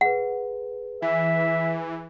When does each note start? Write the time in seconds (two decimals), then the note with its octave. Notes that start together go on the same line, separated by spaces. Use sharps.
0.01 G#4 B4 F#5
1.02 E3 E5